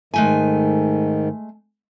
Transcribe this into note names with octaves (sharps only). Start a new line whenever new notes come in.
G#2 D#3 G#3 A3 G#5